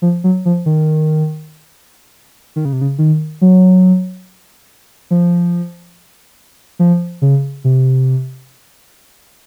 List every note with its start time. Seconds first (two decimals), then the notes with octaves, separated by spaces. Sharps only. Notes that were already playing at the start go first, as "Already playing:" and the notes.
0.02 F3
0.24 F#3
0.45 F3
0.66 D#3
2.56 D#3
2.65 C#3
2.73 C3
2.81 C#3
2.99 D#3
3.41 F#3
5.11 F3
6.79 F3
7.22 C#3
7.64 C3